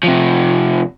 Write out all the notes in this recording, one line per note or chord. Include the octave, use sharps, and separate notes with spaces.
C3 F3